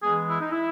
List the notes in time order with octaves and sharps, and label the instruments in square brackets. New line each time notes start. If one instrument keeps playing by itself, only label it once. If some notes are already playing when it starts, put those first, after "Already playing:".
[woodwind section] E3 G#3 B3 G#4
E4
D#4
E4